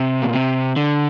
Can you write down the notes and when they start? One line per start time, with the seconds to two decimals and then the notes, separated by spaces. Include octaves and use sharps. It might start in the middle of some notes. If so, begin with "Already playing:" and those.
Already playing: C3
0.22 A#2
0.33 C3
0.76 D3